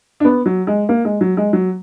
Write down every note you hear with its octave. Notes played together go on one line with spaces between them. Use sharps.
D4
B3
F#3
G#3
A#3
G#3
F#3
G#3
F#3